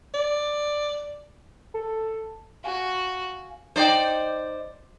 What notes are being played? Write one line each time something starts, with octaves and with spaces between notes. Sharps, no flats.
D5
A4
F#4 F5 G#5
D#4 C5 D5 D#5 G5